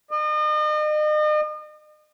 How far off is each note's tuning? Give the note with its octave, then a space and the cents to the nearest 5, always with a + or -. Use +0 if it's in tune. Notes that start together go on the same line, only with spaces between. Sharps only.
D#5 -40